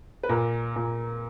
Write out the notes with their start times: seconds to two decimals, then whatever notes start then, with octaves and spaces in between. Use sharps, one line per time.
0.23 B4
0.29 A#2 A#4
0.76 A#2